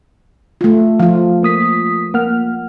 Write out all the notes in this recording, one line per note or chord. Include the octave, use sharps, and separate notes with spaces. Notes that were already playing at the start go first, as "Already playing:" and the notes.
A3 F4
F3 F4 F5
A#3 D#6 B6
A#3 F#5 F6